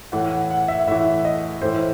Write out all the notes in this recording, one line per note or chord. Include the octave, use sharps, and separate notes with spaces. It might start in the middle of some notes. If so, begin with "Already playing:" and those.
A2 E3 F#5
F#5
F#5
E5
A2 E3 E5
D#5
A2 E3 C5